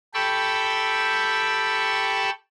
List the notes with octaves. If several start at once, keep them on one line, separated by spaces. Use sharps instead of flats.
G4 A4 G5 B5 C#6 E6